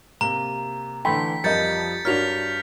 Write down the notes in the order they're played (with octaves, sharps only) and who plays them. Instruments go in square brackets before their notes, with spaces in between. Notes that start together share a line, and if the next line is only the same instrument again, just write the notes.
[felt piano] C3 A#3 [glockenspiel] A#5
[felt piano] D3 E3 A3 [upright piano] G5 B5 C6 [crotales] B6
[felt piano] F2 F3 [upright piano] G3 A#4 D#5 [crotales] G6 A6 C#7
[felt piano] G2 C#5 [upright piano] D4 F#4 A#4 [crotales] F6 B6 F7